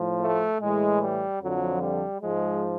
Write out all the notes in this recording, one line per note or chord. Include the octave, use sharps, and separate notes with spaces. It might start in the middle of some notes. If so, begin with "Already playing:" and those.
Already playing: A2 F3
A3
A2 E3 G#3
G3
F2 D3 F3 F#3
G3
G#2 F3 G#3